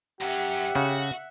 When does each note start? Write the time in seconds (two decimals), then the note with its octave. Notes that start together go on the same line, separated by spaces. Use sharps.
0.21 F#2 C#4 G4 E5 F#5 F#6
0.76 C#3 F#4